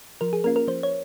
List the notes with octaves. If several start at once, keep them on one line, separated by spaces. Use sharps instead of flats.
F3 A#4
G#4
A#3 C#4 F4 A#4
A#4
F3 C5
C#5